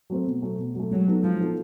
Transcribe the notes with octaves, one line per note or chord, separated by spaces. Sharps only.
F#3 A3 C4
B2
F#3 A3
B2
F#3 A3
F#3 G#3
B3 D#4 F#4 A4
F3 G#3
B3 D#4 F#4 A4